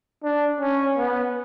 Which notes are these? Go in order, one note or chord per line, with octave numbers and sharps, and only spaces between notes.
D4
C#4
B3